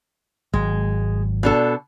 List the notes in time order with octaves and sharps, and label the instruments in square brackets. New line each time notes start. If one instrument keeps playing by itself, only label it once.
[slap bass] G#1 F#3 [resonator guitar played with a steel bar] G#3
[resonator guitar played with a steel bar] B2 D4 A4